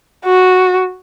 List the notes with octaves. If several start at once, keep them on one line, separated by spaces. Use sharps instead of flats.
F#4